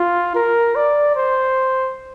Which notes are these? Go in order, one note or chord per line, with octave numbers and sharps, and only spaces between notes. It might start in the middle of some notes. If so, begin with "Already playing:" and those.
Already playing: F4
A#4
D5
C5